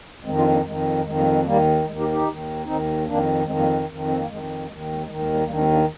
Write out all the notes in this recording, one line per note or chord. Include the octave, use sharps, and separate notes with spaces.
F2 D#3 G#3 C4
D4 F4
A#3 D4
F2 D#3 G#3
F2 D#3 G#3
G3 A#3
G#3 C4
D#2 D#3 G3 A#3
D#2 D#3 G#3
D#4 G4
D#4 G4
D#2 D#3
D#2 D#3 C4 D#4
F2 D#3 A#3 D4
F2 D#3 G#3 C4
G3 A#3
F2 D#3
C4
A#3
F2 D#3 G#3
D#2 G#3
D#3
G#3
D#2 D#3 G#3
G#3
G3
D#2 D#3 G3 A#3
D4
G#3 C4
A#3 D4